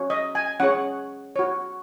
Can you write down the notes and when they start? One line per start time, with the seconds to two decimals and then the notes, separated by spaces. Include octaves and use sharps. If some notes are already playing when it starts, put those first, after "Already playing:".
Already playing: C#4 F#4 C#5
0.10 D#5
0.35 G#5
0.60 C#4 G#4 C#5 F#5
1.36 F#4 C#5